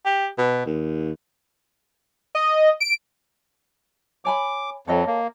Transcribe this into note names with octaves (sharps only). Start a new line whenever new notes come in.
G4
B2
D#2
D#5
D7
C#5 G#5 B5 D6
F2 A4 C#5 D#5
A#3